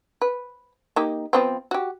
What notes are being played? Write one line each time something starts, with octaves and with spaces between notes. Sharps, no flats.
B4
A#3 D#4 G4
F3 B3 C4
F#4 G4